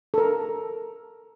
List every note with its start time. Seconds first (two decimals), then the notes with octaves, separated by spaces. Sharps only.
0.14 A4 A#4